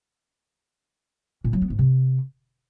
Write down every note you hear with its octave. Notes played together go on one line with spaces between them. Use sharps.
A#2
F#3
B3
G#2
C3